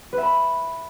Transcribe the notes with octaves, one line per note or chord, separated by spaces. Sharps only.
B4
E5
B5